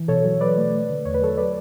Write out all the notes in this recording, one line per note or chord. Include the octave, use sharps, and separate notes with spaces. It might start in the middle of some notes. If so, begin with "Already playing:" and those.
Already playing: E3
B2 A4 C#5
F#3
B2 B4 D5
A3
A3
D3
E2 C#5
B4
F#3 A4 C#5
B4 D5